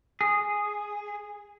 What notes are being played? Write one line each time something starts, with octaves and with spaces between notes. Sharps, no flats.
G#4